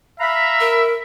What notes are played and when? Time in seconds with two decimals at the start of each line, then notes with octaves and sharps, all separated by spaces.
0.20 E5 F5 A#5 B5
0.60 A#4